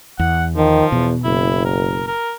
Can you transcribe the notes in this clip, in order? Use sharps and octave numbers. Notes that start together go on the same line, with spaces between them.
E2 F#5
D#3 F3
E2 B2
F#1 E4
A#4
A#4